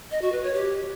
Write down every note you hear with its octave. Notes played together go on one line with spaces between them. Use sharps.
D#5
F#4
B4
C#5
G4